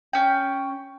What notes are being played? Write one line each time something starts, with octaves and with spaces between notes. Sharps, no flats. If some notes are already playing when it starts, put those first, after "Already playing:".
C#4 G5